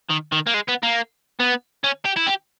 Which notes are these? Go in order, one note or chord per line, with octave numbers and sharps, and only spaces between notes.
D#3
D#3
A#3
G#3
B3
A#3
B3
C#4
G4
E4
G4